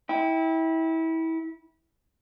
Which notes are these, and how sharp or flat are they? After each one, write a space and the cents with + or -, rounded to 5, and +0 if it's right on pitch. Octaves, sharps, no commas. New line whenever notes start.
E4 -25 G5 +0